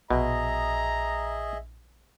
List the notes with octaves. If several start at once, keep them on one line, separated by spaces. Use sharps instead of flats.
A#1 B2 G#4 D#5 E5 A#5